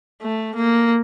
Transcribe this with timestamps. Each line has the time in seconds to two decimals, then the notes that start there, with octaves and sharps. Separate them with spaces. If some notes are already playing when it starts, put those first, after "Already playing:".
0.23 A3
0.56 A#3